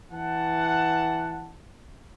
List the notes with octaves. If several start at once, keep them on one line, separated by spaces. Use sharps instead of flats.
E3 F#5 A5